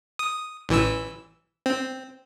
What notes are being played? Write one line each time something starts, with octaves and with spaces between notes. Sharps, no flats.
D#6
A1 E3 E6
C4